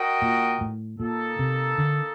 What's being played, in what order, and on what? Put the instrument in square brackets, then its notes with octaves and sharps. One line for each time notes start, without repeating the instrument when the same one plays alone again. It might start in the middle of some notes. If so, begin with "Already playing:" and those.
Already playing: [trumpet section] F#4 A#4 D#5 G5
[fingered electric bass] A#2
A2
[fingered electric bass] A#2 [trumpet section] A#3 D#4 A4
[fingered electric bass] C3
D3